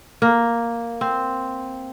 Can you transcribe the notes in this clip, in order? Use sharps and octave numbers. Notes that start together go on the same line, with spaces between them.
A#3
C4